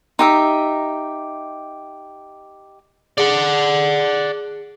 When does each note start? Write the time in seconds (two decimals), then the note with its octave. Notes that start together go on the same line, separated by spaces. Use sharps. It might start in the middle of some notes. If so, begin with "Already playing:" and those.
0.19 D#4 G4 E5
3.18 G#4 D5 F#5 A5